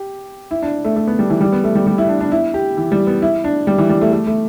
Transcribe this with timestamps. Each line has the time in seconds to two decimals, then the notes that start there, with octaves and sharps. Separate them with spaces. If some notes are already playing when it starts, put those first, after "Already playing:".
Already playing: G4
0.51 E4
0.62 D4
0.85 A3
0.97 A3
1.08 B3
1.19 G3
1.30 E3
1.41 G3
1.52 B3
1.64 A3
1.75 G3
1.86 G3
1.98 E4
2.09 D4
2.21 D4
2.32 E4
2.54 G4
2.77 E3
2.92 G3
3.07 B3
3.22 E4
3.44 D4
3.67 G3
3.78 E3
3.89 G3
4.02 A3
4.12 A3
4.27 A3